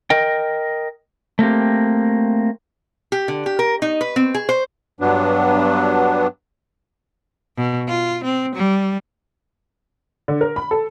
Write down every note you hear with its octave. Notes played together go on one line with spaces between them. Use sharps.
A#4 D#5 G5
A3 A#3 C4 G4
G4
D3
G4
A#4
D#4
B4
C4
G#4
C5
G2 F#3 B3 D4
B2
F4
C4
G3
D3
A#4
B5
A4